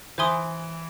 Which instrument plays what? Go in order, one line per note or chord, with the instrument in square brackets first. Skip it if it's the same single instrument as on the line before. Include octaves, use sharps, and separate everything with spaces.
[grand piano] E3 [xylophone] C5 E5 G#5 C6 D#6